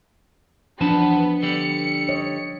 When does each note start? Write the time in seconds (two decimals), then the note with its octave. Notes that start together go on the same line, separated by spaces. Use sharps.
0.81 E2 F3 B3 D4 C5 A5
1.43 D3 G3 C#7
2.09 C#5 D#5